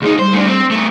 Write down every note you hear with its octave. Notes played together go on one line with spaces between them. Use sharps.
D2 D#4 G#4
G3 C5
A3 D4
C4
A3 B3